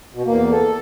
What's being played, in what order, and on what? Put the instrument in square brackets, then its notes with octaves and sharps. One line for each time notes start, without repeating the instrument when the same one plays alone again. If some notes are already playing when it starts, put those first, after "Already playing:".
[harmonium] B2
E2 A#3
A4